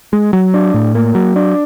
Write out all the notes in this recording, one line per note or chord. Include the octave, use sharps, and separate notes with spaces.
G#3
F#3
D4
A2
A#3
F#3
D4